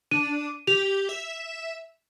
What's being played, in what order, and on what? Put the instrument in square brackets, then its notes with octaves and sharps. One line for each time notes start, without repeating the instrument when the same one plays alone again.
[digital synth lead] D4 [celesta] D#7
[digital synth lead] G4 [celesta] F7
[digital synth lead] E5